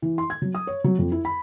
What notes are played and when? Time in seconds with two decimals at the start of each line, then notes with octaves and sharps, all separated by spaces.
0.02 E3
0.18 C6
0.30 G#6
0.42 F#3
0.55 D#6
0.67 C#5
0.84 F#3
0.99 F2
1.12 E4
1.25 B5